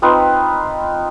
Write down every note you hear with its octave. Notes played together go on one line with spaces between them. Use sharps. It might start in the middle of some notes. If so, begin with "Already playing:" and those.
C4 D#4 F4 B4